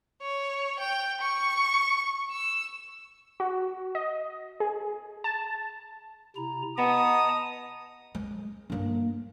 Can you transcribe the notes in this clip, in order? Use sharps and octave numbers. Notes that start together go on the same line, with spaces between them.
C#5
G5
C#6
E6
F#4
D#5
G#4
A5
C3 E4 A#5
B3 D#5 A5 A#5 D#6
G#3
G2 A#3